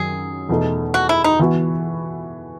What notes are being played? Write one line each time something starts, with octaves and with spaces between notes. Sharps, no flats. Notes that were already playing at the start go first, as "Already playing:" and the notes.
Already playing: F#2 D#3 F#3 G#4
E2 B2 A3 D#4
F#4
E4
D#4
E3 B3 F#4